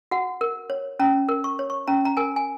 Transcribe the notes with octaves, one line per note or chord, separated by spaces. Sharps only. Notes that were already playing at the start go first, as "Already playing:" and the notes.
F#4 F#5
A#4
C#5
C#4 A#5
A#4
C#6
C#5
C#6
C#4 A#5
A#5
A#4 G#5
G#5